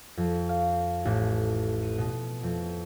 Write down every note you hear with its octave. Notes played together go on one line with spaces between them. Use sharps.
F2
F5
A1
D#7
B2
F2